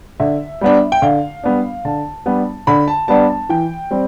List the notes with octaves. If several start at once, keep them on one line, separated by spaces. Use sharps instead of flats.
D3 E5
G3 B3 D4
G5
D3 F5
G3 B3 D4
D3 A5
G3 B3 D4
D3 B5
A5
G3 B3 D4 A5
A5
E3 G5
G3 C4